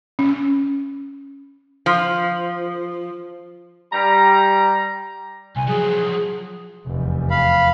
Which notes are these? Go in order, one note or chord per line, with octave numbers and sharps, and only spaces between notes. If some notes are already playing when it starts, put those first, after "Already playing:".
C#4
F3
G3 A#5
C2 G#5
F3 F#3 G#4
F1 E2
F5 B5